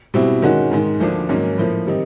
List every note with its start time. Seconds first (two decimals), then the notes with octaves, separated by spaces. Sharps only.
0.14 B2 G3 C4 E4
0.42 D#3 G#3 C#4 F#4
0.71 G#2 D#3 G#3
1.00 D2 D3 F3 A#3 D4
1.29 G#2 D#3 F#3 A#3 C#4
1.58 A2 F3 A#3
1.87 D#3 G3 C4 D#4